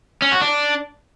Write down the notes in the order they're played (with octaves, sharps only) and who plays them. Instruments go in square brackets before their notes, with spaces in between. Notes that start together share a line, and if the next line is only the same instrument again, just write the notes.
[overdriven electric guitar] C#4
F#4
D4